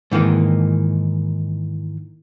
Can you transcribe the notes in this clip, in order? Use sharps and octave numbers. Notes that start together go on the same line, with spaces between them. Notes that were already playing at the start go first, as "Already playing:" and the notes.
G#2 D#3 E3 A#3 D#4